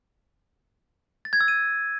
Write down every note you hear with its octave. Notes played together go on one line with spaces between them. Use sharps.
A6
G#6
E6
D#7